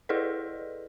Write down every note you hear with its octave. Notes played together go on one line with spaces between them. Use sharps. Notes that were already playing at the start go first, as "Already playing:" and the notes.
E4 G#4 A4 B4 D5 D#5